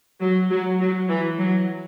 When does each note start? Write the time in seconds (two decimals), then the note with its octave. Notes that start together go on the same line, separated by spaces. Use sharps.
0.20 F#3
0.50 F#3
0.80 F#3
1.09 E3
1.39 F#3